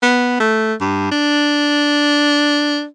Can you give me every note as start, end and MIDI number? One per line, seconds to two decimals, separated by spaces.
0.03 0.37 59
0.40 0.74 57
0.80 1.10 43
1.11 2.85 62